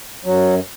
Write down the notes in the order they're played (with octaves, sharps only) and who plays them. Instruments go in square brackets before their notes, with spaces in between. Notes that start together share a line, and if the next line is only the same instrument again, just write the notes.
[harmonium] F#2 F#3